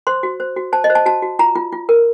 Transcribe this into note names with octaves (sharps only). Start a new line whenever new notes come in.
C5 C6
F#4
C5
F#4
C5 A5
D#5
C5
A5
F#4 A5
F#4
F4 A#5
F4
F4
A#4